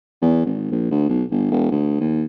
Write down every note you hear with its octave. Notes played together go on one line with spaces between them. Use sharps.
E2
G#1
A#1
D2
B1
G1
E1
D2
D#2